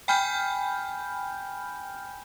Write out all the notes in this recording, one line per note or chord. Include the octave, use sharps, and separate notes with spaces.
G5 G#5 B5 F6 G6